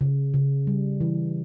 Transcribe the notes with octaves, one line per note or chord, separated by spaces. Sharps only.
C#3
C#3
G3
E3